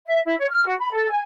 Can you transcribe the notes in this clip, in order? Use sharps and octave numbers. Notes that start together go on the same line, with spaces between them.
E5
E4
C#5
F6
F#4
B5
A4
G#5